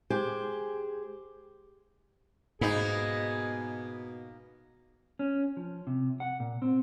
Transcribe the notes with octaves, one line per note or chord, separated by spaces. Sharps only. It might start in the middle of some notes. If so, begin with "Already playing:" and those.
G#3 G4 G#4 C5
G#2 B2 A#3 B3 D#4 G#4
C#4
F3
C3
F#5
A#2
C4